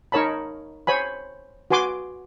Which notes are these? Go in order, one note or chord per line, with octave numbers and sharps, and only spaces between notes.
D#4 A#4 C#5 A5 B5
C5 C#5 G#5 B5
F#4 B4 G#5 C6 D6